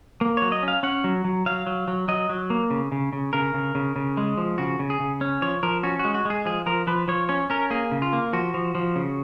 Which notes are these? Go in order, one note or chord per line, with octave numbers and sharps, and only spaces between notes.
A#3
F#3 C#5
D#5
C#4 F5
C#4 F#5
F#3
F#3
F#3 F5
F#3
F#3
F#3 D#5
F#3
A#3
C#3
C#3
C#3
C#3 A#4
C#3
C#3
C#3
G#3
F3
C#3 F#4
C#3
G#4
C#3
C#4
F3 C#5
F3 A#4
C#4 F#4
F#4
G#3
F#4
G#3 G#4
F3 G#4
F3 A#4
F3 B4
F3 C#5
C#4 C#5
C#4 A#4
A#3 G#4
C#3
F4
A#3
F3 F#4
F3
F3
C#3